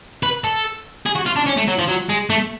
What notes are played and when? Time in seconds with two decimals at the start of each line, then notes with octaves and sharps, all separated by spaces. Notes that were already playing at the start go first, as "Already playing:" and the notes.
0.23 B4
0.44 A4
1.06 G#4
1.16 F#4
1.26 F4
1.37 D4
1.47 C#4
1.57 A3
1.68 F#3
1.79 F3
1.88 F#3
2.09 G#3
2.30 A3